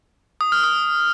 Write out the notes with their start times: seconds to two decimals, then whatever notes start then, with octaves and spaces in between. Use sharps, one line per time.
0.41 D#6
0.52 F6
0.64 D#6